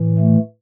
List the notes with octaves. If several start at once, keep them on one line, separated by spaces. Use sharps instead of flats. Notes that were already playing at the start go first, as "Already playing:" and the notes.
Already playing: A2 E3
A3